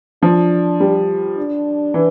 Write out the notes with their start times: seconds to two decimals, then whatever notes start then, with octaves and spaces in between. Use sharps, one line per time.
0.22 F3 D4
0.80 G3
1.37 D4
1.94 E3